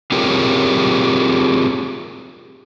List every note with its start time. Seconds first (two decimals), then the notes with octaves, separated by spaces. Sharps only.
0.12 C4 F4 G4 G#4 A#4 C#5